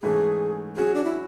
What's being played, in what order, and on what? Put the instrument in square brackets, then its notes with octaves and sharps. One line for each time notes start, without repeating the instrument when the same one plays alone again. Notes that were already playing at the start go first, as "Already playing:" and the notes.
[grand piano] G#2 E3 A3 C#4 [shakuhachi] G#4
[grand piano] F#3 C#4 F#4 [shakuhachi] G#4
[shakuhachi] D4
E4